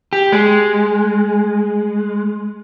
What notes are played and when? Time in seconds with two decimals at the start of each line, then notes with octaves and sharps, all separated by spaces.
0.13 G4
0.32 G#3